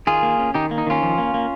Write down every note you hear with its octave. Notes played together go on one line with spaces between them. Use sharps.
D#3 F4 G#4
A#3
C#4
D#3 D#4 G4
A#3
D#4
D#3 C#4 F4
F3
A#3
A#3